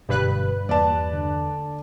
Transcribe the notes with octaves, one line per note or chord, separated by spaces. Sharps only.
F#1 G2 B2 D3 B4 F#6
E2 E3 A#3 D5 A5
D3